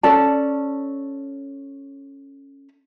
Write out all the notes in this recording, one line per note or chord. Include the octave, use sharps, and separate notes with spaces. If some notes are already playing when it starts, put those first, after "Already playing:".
C#4 A4 D5 A5